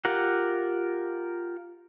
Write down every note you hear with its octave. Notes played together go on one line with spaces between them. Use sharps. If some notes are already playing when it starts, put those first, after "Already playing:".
F4 G4 A#4 F#5